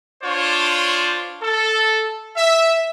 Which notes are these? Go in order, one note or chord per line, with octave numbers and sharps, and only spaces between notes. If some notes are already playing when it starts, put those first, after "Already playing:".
D4 F4 C5 C#5
A4
E5